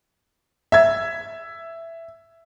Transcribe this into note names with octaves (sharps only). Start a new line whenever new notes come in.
E5 G#6